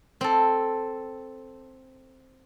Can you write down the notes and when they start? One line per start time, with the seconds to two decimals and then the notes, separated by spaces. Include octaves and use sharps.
0.21 C4 A4